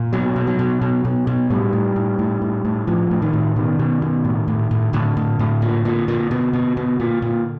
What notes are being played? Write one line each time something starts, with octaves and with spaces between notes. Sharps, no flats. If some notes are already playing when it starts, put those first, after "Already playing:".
Already playing: A#2
B2 F#3
B2
F#3
B2
B2
B2
B2
A2 G3
A2
A2
A2
A2
A2
A2 F3
A2
D#3
A2
B2 D#3
B2
B2
A2
A2
A2
A2 D3
A2
A2
A#2
A#2
A#2
B2
B2
B2
A#2
A#2